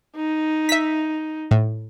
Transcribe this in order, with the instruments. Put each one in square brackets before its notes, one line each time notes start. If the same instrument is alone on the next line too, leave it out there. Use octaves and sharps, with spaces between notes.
[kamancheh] D#4
[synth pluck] E5 B6
A2